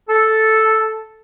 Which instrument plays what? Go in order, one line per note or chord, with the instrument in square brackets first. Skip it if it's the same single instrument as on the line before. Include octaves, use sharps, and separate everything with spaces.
[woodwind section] A4